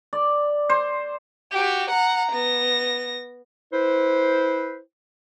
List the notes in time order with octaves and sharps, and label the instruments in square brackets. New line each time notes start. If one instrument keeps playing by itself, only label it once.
[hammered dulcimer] D5
C5
[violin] F#4 G4
F#5 A#5
B3 A#6
[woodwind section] E4 B4 C5